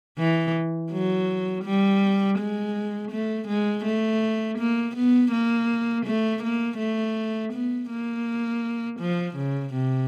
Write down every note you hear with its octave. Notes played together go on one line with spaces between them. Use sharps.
E3
F#3
G3
G#3
A3
G#3
A3
A#3
B3
A#3
A3
A#3
A3
B3
A#3
F3
C#3
C3